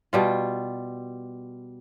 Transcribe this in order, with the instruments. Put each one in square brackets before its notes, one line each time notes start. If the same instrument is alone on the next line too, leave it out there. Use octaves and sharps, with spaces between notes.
[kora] B2 G3 F4